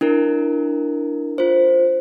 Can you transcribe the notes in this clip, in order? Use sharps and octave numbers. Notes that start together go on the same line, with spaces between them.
D4 E4 A#4
F4 C5